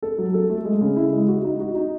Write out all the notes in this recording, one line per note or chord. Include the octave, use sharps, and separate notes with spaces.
A4
F#3
A4
A3
G#3
C#3
E4
G#3
F#4
D#4
F#4
D#4